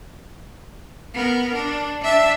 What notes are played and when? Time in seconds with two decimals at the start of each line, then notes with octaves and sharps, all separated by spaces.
1.14 B3 A#4
1.54 D4
2.01 D4 E5